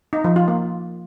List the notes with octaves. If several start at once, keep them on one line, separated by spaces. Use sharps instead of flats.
D#4
F3
F4
A#3